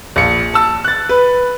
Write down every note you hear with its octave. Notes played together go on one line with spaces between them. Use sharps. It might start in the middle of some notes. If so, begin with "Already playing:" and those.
A#1 C#7
A5 E6
F#6 A6
B4